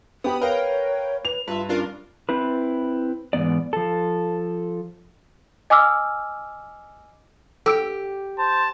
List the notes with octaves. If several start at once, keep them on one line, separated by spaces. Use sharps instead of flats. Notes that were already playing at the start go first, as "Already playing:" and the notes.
B3 G4 B5 D#6
A#4 B4 C#5 F5 G5
B4 F7
G2 F4 B4 E5
C#4 D4 F4 A#4
C4 E4 B4
G#2 E3 B3 D5
F3 A4
D#5 G#5 D6 E6 F6
G4 A4 E6 D7
C5 A5